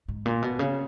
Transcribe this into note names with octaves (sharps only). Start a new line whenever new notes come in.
G#2
A#2
B2
C#3